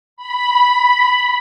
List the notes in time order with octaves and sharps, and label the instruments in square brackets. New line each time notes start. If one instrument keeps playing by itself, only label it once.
[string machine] B5